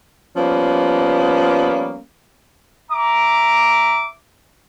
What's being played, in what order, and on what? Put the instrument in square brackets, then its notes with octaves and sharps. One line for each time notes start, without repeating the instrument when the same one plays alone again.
[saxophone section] F3 G3 A#3 B3 C#4
[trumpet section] E5 D6 [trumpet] A#5